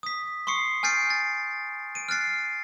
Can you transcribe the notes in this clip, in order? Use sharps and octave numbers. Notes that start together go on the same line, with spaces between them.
D#6 B6
C6 C#6 D#6 C7 C#7
G#5 F6 G6 A6 C7 D7
A6
D7 D#7
F6 F#6 A6 C7